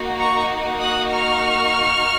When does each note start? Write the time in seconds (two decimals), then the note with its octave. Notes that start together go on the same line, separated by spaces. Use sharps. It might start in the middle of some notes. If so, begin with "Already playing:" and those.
Already playing: A#3 D#4 F#4
0.18 A#5 C#6
0.80 D#6 F#6
1.10 C#6 F6